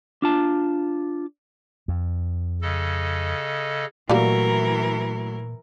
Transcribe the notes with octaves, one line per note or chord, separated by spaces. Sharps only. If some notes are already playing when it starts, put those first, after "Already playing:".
D4 F4 A5
F2
C#3 A4 D#5
A#2 E3 F#3 G3 A3 A#3 E4 A#4